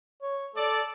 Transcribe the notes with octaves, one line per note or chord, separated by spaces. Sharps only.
C#5
A4 D5